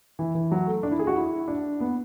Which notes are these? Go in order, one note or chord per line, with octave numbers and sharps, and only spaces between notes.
E3
E3
F#3
A3
D4
E4
G#4
F#4
E4
D4
B3